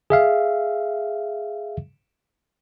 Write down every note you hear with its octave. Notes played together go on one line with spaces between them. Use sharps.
G#4 E5 F5